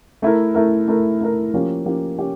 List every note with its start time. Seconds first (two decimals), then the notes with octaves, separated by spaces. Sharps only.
0.22 A3 E4 A#4
0.54 A3 E4 A#4
0.88 A3 E4 A#4
1.21 A3 E4 A#4
1.54 F3 A#3 C#4 G4
1.85 F3 A#3 C#4 G4
2.19 C#4 G4